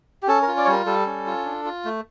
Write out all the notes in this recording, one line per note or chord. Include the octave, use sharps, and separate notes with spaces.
G4
C#4 A4
A#4
F4
D5
C#5
G3 A#4
G3 A4
C#4
F4
D4
F4
A3